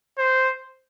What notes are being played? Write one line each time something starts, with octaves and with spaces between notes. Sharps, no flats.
C5